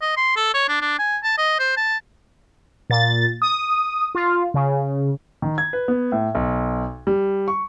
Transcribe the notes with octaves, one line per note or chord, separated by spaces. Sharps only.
D#5
C6
A4
C#5
D4
D4
G#5
A5
D#5
C5
A5
A#2 A6
D#6
F4
C#3
D#3
G#6
B4
B3
A2
B1
G3
C#6